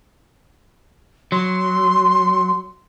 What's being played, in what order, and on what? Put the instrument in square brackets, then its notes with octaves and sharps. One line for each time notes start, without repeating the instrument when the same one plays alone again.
[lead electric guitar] F#3 [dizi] C6